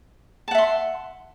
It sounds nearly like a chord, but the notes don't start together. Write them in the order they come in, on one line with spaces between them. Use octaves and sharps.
A5 F#5 E5 C6